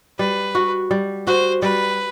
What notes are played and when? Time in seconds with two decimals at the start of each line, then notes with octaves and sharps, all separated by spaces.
0.19 G3 B4
0.55 F#4
0.91 G3
1.27 F#4 C5
1.62 G3 B4